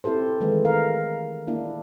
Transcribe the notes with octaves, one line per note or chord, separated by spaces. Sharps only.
C4 E4 G4 A4 C5
D#3 E3 G#3 A3
A#4 F5
A#3 D4 E4